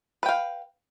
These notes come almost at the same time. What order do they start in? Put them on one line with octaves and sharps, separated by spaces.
B4 G5 F5